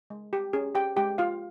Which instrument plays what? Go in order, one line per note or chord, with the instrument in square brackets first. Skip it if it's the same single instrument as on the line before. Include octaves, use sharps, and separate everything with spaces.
[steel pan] G#3
G4
C#4 G#4
G4 G5
G#3 G4 G5
F4 F5